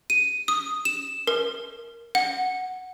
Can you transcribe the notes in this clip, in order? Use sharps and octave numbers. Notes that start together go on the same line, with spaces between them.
D#7
D#6
E7
A#4
F#5